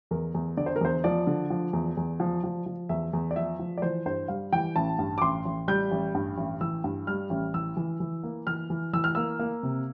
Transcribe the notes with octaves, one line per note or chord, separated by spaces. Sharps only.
E2 A#4
E2
D3 D5
C5
A#4
E2 C5
F3 D5
D3
F3
E2
E2
F3
F3
F3
E2 E5
E2
D5
F3 E5
F3
D5
E3 C5
G2 C5
G3 F5
E3 G5
A1 A5
G2
D6
A1 C6
A1
G3 G6
A1
G2
A1
E3 E6
G2
G3 F6
A1
E3 E6
E3
E3
A#3
E3 F6
E3
E3 E6
F6
A#3 E6
A#3
C3